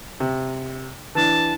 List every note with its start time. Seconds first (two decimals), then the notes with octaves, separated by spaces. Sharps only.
0.20 C3
1.15 E3 D4 A5